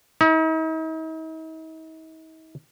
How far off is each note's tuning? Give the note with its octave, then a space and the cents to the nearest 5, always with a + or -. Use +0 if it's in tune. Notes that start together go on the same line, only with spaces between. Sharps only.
D#4 +45